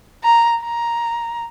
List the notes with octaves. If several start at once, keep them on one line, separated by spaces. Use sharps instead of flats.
A#5
A#5